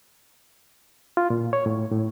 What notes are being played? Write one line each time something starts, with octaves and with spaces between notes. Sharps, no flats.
F4
A#2
C#5
A2
A2